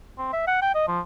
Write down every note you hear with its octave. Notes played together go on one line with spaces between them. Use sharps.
C4
E5
F#5
G5
D#5
F3